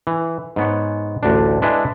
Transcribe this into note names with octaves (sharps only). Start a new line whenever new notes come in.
E3
G#2 B3 C#5
A1 D2 D4
G#3 D4 E4 B4 E5